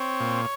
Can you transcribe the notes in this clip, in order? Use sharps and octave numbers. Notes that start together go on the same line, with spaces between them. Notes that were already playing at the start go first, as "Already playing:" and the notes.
Already playing: C4 C#5
A#2